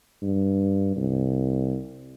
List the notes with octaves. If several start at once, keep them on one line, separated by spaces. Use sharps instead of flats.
G2
C2